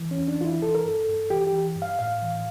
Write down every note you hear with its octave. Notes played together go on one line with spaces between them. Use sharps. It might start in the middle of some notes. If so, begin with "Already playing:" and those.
Already playing: E3
C#4
E2
D4
E3 E4 F4
E3 A4
A#4
G2 A4
G2
E3 G4
G4
E3
G2
F5
A2 F5
E3